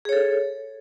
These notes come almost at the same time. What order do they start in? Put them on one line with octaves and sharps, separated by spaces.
G#4 C#5 A4